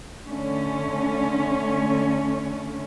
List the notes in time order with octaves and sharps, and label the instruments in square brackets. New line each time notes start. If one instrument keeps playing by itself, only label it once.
[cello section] D3 A3 C#4